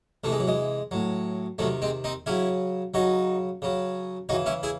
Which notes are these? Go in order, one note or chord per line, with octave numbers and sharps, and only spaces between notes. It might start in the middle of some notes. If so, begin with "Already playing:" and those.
C3 E3 A3
G#3
F#3
G#3
A2 F#3
C3 D#3 F#3 A3
G#3 C4
C4 D#4
C#3 F#3 C#4 E4
C#3 F#3 D#4 F#4
C#3 F#3
C#3 E3 D#4 F#4
C#4 E4
E4 G#4